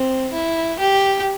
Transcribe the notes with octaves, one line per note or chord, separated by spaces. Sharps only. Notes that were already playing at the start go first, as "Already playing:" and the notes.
Already playing: C4
E4
G4